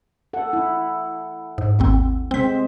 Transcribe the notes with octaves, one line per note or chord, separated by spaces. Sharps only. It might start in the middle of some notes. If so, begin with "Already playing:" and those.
A4 F#5
E4
G#2
G#1 D#2 C4
C3 G#3 C4 C5 B6